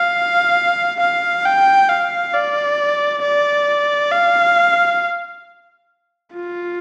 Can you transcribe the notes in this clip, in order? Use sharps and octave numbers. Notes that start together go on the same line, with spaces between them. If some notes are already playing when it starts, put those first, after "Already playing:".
Already playing: F5
F5
G5
F5
D5
D5
F5
F4